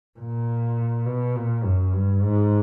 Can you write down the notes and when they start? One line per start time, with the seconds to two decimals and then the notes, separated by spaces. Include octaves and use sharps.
0.19 A#2
1.06 B2
1.36 A#2
1.65 F#2
1.93 G2
2.22 G#2